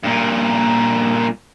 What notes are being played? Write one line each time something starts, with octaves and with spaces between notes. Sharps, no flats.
G2 A#2